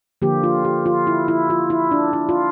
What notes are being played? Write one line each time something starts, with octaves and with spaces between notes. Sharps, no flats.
D3 F3 A#3 G4
F4
G4
F4
E4
E4
F4
E4
D4
E4
F4